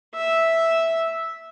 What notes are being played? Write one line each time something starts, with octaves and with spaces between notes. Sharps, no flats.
E5